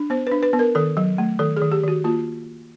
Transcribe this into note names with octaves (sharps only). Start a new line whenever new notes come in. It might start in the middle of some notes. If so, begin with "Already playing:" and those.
Already playing: D4
B3 C5
D4 B4
B4
B3
A#4
D#3 A4
F#3
A3
D#3 A4
G#4
D#3
G4
D#3 F#4
A#3 F4